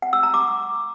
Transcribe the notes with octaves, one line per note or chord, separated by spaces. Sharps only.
F#5
E6
A#5
D6